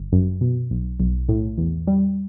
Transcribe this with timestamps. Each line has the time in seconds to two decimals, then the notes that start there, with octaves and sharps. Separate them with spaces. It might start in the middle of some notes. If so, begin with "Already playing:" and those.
Already playing: G1
0.12 F#2
0.41 B2
0.71 B1
1.00 B1
1.29 A2
1.58 E2
1.87 G3